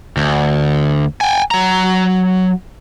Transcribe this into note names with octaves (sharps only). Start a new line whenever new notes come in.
D2
G5 G#5
F#3 A#5